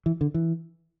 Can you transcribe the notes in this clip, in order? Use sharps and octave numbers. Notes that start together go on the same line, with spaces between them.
E3
D3
E3